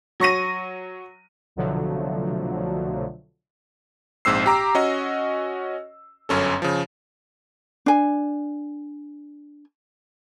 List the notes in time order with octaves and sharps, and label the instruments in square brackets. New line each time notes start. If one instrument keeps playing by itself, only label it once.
[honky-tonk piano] F#3 C#6 A#6 D#7
[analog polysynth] C2 B2 D3 F3 F#3 A3
[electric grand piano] A#1 G#2 C4 E6 C7
G4 A#5 D6
C#4 F#4 D#5
G1 F#2 C#4 A4
C#3 F3
[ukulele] D4 G#5